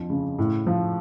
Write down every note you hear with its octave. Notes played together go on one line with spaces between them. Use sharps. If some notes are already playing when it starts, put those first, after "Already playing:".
Already playing: F2 D3 F3
C#3
A2
F3